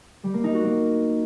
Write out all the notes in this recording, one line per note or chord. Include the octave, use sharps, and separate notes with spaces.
G3
A#3
D#4
F#4
A#3